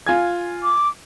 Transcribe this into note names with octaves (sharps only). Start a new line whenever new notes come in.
F4 G#5 G#6
D6